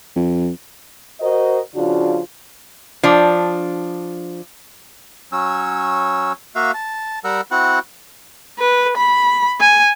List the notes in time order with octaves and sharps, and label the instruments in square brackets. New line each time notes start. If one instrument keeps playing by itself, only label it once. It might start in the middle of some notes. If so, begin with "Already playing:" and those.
[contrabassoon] F2
[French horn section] F#4 A#4 C5 D#5
C#3 F3 D4 F4 F#4
[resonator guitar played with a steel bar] F3 D4
[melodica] F#3 C#4 E6
A#3 F#4 E5 F5
A5
G3 A#4 F#5 E6
C4 E4 F#4 F#5
[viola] B4
B5
G#5